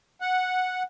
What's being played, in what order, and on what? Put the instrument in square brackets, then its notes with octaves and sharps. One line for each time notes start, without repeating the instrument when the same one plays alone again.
[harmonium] F#5